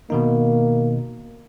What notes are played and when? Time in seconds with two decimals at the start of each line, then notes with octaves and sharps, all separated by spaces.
0.10 B2 D#3 A#3 D#4